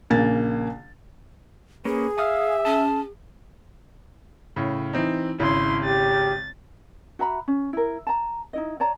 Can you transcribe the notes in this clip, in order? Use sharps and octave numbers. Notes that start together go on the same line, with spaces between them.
A#1 C#3 A#3 G#5 A6
A#3 C#4 G#4 B4
E5 F5 G#5 D#6 F6
C#4 A5
A2 C#3
E3 C4 D#4
G#1 C#3 E4 C6
G4 A6
F#4 E5 A#5 B5
C#4
E4 A#4
A5 A#5
D#4 E4 D#5
C#5 D5 A5 A#5